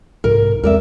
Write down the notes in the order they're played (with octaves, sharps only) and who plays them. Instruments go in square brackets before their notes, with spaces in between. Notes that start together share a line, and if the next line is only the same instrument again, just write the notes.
[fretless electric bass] C2 G#2 C3 [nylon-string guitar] A#4
[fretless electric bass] E2 G#3 C4 [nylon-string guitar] A#4 D5 E5